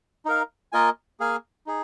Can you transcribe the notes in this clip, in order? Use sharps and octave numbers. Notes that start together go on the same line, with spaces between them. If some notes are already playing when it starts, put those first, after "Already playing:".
D#4 A#4 F5
A#3 F4 A#4 D#5 G#5
A#3 G#4 F5 G#5
D#4 G#4